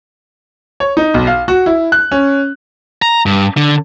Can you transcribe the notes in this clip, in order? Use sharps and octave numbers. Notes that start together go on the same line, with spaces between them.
C#5
D#4
B1
F5
F#4
E4
F#6
C#4
A#5
G2
D3